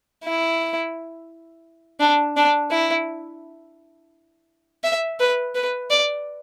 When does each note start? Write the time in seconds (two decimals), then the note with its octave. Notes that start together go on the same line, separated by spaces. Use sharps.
0.24 E4
2.00 D4
2.37 D4
2.71 E4
4.84 E5
5.20 B4
5.55 B4
5.91 D5